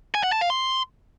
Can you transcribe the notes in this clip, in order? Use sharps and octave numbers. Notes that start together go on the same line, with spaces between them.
G#5
F#5
A5
F5
C6